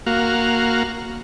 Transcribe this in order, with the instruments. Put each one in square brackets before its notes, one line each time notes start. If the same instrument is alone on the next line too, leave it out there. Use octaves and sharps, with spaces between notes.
[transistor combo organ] A#3 F#4 F5